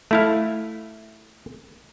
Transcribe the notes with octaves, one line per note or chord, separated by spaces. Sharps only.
A3 E4 F5